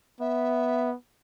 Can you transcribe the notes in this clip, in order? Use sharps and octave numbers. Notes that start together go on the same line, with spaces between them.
B3 E5